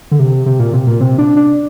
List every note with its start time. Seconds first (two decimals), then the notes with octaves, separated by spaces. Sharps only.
0.11 D3
0.19 C3
0.46 C3
0.59 A#2
0.73 C3
0.87 A#2
1.00 C3
1.18 D4
1.37 D4